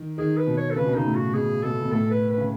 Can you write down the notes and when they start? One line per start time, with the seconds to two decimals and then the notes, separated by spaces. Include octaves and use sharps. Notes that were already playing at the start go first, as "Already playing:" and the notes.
Already playing: D#3
0.18 D#3 G#4
0.37 B4
0.47 B2
0.57 C#5
0.71 A4
0.76 C#3 B4
0.85 B2
0.95 C#3 D#4
1.05 A2
1.15 F#4
1.34 B2 G#4
1.63 B2 A4
1.82 B2
1.91 A2 A4
2.11 B4
2.30 B4
2.38 C#3